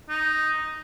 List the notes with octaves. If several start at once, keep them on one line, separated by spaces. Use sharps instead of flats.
D#4